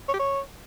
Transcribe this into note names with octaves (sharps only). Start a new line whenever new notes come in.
C#5
G4
C#5